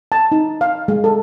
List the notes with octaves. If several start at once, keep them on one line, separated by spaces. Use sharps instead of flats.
A5
D#4
F5
G#3
A4